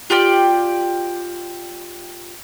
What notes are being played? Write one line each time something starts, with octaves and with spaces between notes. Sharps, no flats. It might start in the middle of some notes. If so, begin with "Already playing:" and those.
F4 G4 D5 G5